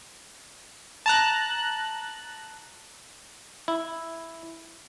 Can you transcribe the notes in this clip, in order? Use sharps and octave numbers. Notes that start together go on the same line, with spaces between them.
A5 A#5 F#6
E4